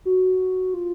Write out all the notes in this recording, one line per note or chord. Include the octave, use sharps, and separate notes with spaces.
F#4
F4